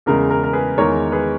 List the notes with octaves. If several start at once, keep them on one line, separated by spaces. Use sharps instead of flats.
E2 C#3 G#3 A#4
A#4
A#4
G#4 B4
E2 D#3 G#3 A#4 C#5
G#4 B4